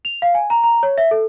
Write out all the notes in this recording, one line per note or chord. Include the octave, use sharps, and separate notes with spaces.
F7
F5
G#5
A#5
A#5
C#5
E5
A4